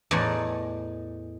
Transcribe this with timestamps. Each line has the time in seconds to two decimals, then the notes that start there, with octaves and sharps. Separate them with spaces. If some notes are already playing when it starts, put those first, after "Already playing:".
0.11 E2 A2 D#4 D5 F#5 G#5